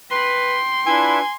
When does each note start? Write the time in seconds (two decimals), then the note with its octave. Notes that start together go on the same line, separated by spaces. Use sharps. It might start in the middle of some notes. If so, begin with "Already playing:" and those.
0.11 B4 G5 C6
0.86 D4 E4 F4 B4 G#5